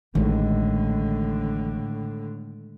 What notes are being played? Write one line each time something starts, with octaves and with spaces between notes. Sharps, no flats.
A1 A2 D3 D#3 G#3